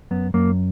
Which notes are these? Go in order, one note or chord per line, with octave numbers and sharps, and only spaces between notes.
F#2 B3
F#2 A#3